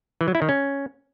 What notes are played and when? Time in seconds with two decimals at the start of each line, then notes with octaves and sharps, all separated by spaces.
0.21 E3
0.28 F#3
0.35 E4
0.42 D#3
0.49 C#4